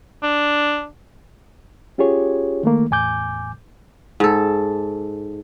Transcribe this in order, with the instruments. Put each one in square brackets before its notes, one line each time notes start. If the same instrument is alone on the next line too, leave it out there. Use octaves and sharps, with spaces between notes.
[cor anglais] D4
[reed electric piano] C#4 F4 G4 G#4 C#5
D#3 A3 A#3
E2 A2 G#5 D6 G6
[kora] G#2 A4